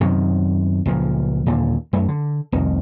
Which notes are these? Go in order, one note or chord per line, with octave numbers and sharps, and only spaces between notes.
F#2 C3 D#3
C#2 A#2 F3
D#2 A#2 D3
F#2 A3
D3
F1 C2 F2 D#3